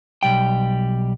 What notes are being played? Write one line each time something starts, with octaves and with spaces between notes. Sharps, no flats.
B1 G3 G5